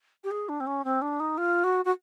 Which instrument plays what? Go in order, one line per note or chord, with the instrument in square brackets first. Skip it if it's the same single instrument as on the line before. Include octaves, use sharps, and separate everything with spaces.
[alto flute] G4
G#4
D4
C4
C#4
C4
D4
D#4
F4
F#4
F#4